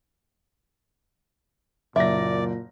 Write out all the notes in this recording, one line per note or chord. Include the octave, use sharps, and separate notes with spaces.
F#1 A#2 D5 E5 A#6